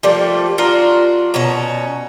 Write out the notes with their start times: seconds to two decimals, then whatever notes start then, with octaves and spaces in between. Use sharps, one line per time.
0.03 F3 G3 A3 A#3
0.58 D4 F4 F#4 A#4
1.34 B2 C#4 A5 A#5